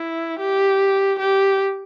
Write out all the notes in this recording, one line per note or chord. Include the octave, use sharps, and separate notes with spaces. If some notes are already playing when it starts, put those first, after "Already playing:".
Already playing: E4
G4
G4